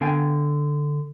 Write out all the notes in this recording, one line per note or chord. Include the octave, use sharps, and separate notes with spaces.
D3 B3 F5 G5 G#5